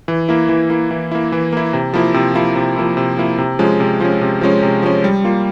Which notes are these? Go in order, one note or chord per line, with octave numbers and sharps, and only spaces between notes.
E3
A#3 E4
E3
A#3 E4
E3
A#3 E4
E3
A#3 E4
C3
F3 A#3 E4
C3
F3 A#3 E4
C3
F3 A#3 E4
C3
F3 A#3 E4
C3
F3 G#3 C#4
C3
F3 G#3 C#4
C3
F3 G#3 C#4
C3
F3 G#3 C#4
G3
A#3 F4